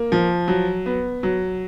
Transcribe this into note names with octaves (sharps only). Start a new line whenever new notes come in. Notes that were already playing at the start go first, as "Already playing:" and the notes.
Already playing: A#3
F3
F#3
B3
F#3